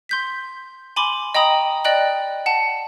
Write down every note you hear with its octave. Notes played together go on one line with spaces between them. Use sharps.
C6 G6 B6
G#5 B5 C6 D6
D#5 G5 A#5 B5 D#6
D5 D#5 G5 F#6 F#7
F#5 A5